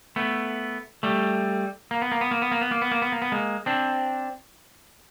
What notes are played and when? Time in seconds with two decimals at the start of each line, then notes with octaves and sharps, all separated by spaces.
0.16 A3 B3
1.03 G3 A3
1.91 A#3
2.02 B3
2.12 A#3
2.21 B3
2.31 A#3
2.42 B3
2.51 A#3
2.61 B3
2.71 A#3
2.82 B3
2.91 A#3
3.02 B3
3.12 A#3
3.22 B3
3.32 G#3 A#3
3.66 C4 D4